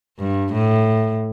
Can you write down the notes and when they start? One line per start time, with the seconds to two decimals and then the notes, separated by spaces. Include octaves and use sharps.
0.19 G2
0.53 A2